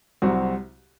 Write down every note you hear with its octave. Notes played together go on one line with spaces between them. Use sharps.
C2 C3 F#3 C4 F#4